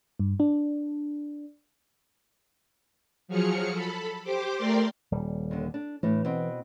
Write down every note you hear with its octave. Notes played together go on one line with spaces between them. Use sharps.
G2
D4
F3 F#3 G#4 F6 C#7
A4 B5
G4 C5 D6
A3 A#4 D5 G5 C6
D#1 G3
D#2 D3
D4
A2 E3 A3 D4
B2 C4